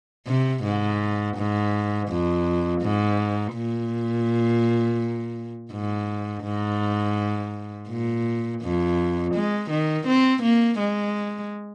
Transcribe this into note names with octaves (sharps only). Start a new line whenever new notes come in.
C3
G#2
G#2
F2
G#2
A#2
G#2
G#2
A#2
F2
G#3
D#3
C4
A#3
G#3